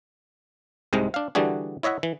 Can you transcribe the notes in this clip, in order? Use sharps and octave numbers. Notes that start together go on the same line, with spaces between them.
C2 G#2 C3 G#3 D#5
D4 F5
D3 E3 G3 D4 F#4 G#4
E4 C#5 D#5 E5 F#5
E3